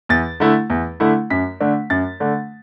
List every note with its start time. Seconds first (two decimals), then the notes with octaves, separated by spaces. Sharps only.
0.09 E2 A6
0.40 D3 A3 E4
0.70 E2
1.00 D3 A3 E4
1.30 F#2 B6
1.61 D3 A3 D4
1.90 F#2 A6
2.20 D3 A3 D4